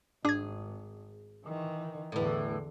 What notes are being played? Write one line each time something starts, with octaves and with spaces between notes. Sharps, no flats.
G#1 D4 G#4 G#6
D#3 E3
E2 A2 D3 E3